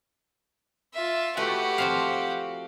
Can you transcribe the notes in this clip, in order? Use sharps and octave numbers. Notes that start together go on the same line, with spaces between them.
F4 E5
A3 F#4 G4 B4 F#5
F3 C4 F5